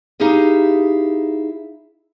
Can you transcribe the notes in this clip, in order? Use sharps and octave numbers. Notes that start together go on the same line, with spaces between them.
D#4 E4 G4 G#4 F5